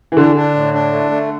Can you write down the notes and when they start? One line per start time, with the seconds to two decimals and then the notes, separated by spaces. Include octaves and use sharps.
0.12 E3
0.17 D3 D4
0.36 D4
0.55 A2
0.74 D4
0.92 A3
1.11 A3